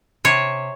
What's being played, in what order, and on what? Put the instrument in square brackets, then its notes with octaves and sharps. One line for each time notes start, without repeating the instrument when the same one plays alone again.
[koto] C3 C#5